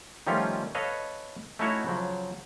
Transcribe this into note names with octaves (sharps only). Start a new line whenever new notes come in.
D#3 F3 G3 A3 C#4 F4
A4 B4 C#5 D#5 F5
A3 C#4 D#4 E4 F#4 C#5
C#3 F3 F#3